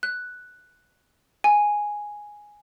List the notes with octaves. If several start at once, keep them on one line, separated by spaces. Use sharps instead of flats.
F#6
G#5